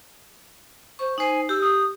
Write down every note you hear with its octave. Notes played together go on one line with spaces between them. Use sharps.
C5 C#6
D#4 C5 G#5
G4 E6
D#6